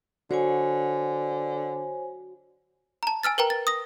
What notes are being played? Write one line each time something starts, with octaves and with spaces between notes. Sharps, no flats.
D3 F#4 C5 C#5 G#5
A5 A#5
G#5 E6 F6 A6
A#4 B4 G5 A#5
A6
D#6 A#6